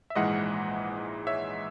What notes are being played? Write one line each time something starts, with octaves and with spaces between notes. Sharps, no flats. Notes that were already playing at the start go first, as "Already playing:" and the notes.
E5
A#1 G#2 E3 G#3 D#5 F#5
C#5 E5